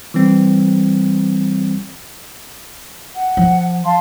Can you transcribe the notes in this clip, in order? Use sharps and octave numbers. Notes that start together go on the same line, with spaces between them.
E3 G3 C4
F#5
F3
F5 A5 C6